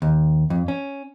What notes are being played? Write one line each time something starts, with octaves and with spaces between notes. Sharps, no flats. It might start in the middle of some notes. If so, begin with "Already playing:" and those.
D#2
F2
C#4